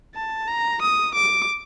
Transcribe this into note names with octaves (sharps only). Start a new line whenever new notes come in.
A5
A#5
D#6
D6